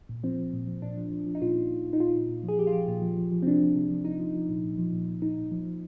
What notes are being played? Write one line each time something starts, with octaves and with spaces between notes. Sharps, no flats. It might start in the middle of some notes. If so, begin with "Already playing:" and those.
A#2
F3 C4
F3
A#2
F3
A#2 D4
F3
F3
F3
D#4
A#2 F4
A#2
A#2
A#2
D#4
A#2 F4
A#2
A#2
F3 G#4
F3 G4
F4
F3 G4
A#2 F4
F3
F3
F3
C4
C3 D4
F3
C3
F3
F3 D#4
F3
F3
A#2
A#2
F3
A#2
A#2
A#2 D#4
A#2
F3
F3